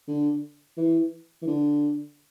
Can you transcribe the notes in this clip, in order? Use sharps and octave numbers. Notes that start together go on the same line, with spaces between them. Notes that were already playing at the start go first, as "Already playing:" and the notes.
D3
E3
E3
D3